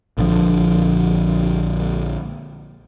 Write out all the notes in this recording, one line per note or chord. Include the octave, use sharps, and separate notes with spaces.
A#1 D3 F3